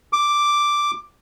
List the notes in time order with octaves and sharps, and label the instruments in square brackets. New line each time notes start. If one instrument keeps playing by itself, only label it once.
[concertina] D6